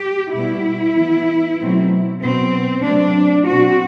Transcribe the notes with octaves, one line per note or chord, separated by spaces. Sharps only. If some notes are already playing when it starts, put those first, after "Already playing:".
Already playing: G4
B2 G3 B3 E4
E3 B3
B2 F#3 A3 C4
B2 F#3 B3 C4
C3 F#3 A3 C4 D4
B2 F#3 C4 F#4